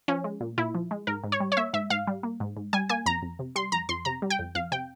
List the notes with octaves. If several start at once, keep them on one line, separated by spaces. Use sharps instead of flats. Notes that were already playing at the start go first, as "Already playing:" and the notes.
F3 C#4
G#3
A#2
A#2 E4
F3
G#3
G#2 A#4
G#2
C#5
G3
C#5
A#3 E5
G#2 E5
G#2 F5
G3
A#3
G#2
G#2
G3 G#5
A#3 G#5
F2 A#5
F2
C3
G3 C6
F2 A#5
F2 C6
C3 A#5
G3
G5
F2
F2 F5
C3 G5